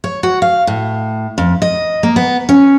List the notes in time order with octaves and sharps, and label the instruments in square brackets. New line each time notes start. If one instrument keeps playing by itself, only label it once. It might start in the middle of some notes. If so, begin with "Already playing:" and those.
[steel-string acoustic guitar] C#5
F#4
F5
A2
F2
D#5
A#3
B3
C#4